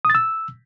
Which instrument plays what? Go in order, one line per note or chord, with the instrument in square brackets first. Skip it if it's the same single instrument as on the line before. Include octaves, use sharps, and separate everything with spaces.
[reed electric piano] D#6
A6
E6